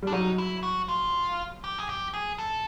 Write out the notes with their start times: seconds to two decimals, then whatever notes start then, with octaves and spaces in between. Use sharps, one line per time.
0.02 G3 D4
0.12 F#3 D#4
0.38 E4
0.63 F#4
0.88 F4
1.64 G4
1.78 G#4
1.89 G4
2.14 G#4
2.38 A4